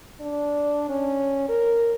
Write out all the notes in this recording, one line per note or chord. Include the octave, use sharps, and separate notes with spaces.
D4
C#4
A#4